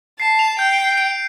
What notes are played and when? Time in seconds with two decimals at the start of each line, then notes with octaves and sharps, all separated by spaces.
0.19 A5 C7
0.39 F7
0.59 G5 G6
0.79 C7
0.97 D7